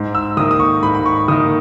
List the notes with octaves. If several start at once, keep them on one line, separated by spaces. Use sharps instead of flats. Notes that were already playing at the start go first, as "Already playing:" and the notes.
Already playing: G#2
E6
D#3 A#3 D#6
D#6
C#6
G#2 B5
B5
C#6
D#3 A#3 D#6